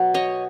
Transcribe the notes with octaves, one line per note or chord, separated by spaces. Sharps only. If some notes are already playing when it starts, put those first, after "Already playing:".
Already playing: B2 F#3 B3
C#5 D#5